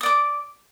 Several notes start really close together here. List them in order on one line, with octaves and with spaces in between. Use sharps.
D#6 D5 D6